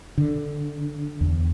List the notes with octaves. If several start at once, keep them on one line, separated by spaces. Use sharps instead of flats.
D3
E2